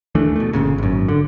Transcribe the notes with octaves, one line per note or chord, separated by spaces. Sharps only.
D#2 E3 A3 D4
B2 A3
G1 A#2 C#3
G#1 F#2
D3